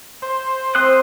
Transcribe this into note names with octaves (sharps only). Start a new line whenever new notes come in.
C5
C4 C6 D#6 F#6